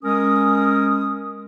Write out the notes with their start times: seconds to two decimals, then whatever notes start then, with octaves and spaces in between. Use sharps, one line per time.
0.03 G#3 C#4 A#4 D#6